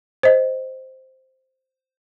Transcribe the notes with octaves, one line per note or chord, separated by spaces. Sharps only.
C5 D#5